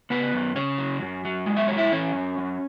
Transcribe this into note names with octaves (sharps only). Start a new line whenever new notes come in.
C#3 B3 B4
F#2
C#3 C#4 C#5
F#3
F#2
F#3
G#3
E5
F#2 C#5
E4 E5
E3 C#4 C#5
F#2
F#2